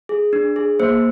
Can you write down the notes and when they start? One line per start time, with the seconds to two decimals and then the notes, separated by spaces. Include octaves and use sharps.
0.09 G#4
0.33 D4
0.56 G#4
0.80 A#3 C5